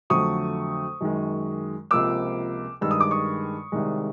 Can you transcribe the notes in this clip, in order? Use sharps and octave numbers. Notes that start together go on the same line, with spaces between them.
F2 D3 F#3 A3 C#6 D#6
F#2 D#3 G#3
C#2 C3 F3 A#3 D6 E6
G2 D#3 G#3 E6
D#6
D6
C#6 D#6
C2 C3 D#3 G#3